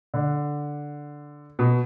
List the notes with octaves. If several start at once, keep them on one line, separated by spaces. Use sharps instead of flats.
D3
B2